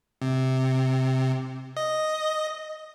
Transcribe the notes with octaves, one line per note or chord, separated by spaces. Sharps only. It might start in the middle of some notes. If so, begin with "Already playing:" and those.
C3
D#5